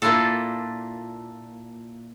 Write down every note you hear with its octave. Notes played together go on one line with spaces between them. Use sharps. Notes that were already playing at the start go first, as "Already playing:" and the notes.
A#2 A#3 D4 E4 F4 A4